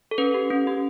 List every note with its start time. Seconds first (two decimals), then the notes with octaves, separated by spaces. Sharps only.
0.11 A4
0.18 C#4 B4
0.34 G4
0.50 C#4
0.67 G4